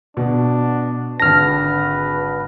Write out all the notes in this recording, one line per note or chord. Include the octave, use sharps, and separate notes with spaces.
B2 D4
G#1 D3 B4 A5 F6 A#6